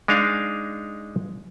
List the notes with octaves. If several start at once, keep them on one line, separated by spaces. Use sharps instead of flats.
G#3 D4 D#4 F5